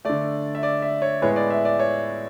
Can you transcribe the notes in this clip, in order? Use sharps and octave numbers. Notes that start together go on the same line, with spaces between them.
D3 A3 D5
E5
D5
E5
C#5
A2 G#3 B3 C#5
D5
E5
D5
C#5